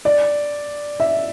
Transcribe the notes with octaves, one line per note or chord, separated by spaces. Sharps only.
D5
E5